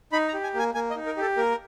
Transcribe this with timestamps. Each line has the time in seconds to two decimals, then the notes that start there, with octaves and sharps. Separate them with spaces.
0.12 D#4 B5
0.28 A#5
0.34 G4
0.43 G#5
0.54 A#3
0.59 G#5
0.75 A#3 G#5
0.90 D#5
0.96 D#4
1.06 A#4
1.17 G4 A4
1.37 A#3 A#4